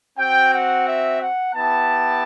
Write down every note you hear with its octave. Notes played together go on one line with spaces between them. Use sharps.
C4 F#4 G5
F#5
E5
F#5
B3 E4 G4 A5